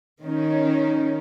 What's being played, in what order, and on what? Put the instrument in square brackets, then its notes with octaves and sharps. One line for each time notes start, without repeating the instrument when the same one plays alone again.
[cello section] D#3 C#4 D#4